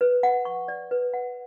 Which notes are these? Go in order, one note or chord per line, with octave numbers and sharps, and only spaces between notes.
B4
F#5
C#6
D5
B4
F#5